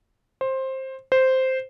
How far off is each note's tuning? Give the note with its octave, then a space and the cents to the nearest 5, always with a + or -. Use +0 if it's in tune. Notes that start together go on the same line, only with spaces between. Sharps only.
C5 +15
C5 -5